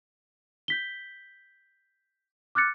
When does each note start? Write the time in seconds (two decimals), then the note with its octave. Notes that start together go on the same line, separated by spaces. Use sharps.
0.68 G6 B6 G7
2.55 D6 F6 F#6 A6 C#7